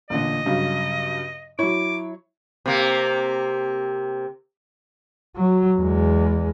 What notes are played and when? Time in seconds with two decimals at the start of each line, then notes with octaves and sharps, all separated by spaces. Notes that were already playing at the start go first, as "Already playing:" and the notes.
0.10 A1 A#2 D3 D#5
0.46 G2 C#3 F#3
1.59 F#3 E4 C#5 D6
2.66 C3 A#3
5.36 F#3
5.79 E2 G#3